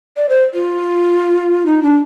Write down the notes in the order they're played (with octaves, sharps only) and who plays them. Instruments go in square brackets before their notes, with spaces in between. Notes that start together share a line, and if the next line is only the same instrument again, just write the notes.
[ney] D5
C5
F4
D#4
D4